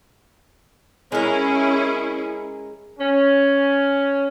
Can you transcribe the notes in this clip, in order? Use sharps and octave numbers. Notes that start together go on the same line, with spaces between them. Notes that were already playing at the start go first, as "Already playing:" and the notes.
G#3 C#4 E4 G#4 A#4
C#4